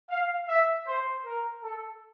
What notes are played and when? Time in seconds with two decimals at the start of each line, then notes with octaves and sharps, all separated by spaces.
0.10 F5
0.49 E5
0.87 C5
1.25 A#4
1.64 A4